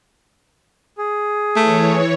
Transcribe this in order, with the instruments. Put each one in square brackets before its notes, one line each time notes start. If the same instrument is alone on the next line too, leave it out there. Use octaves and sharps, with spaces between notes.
[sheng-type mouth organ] G#4
[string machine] E3 C#5 [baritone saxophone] A3